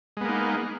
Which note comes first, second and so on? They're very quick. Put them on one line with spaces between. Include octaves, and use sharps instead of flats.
G#3 B3 A#3 D#4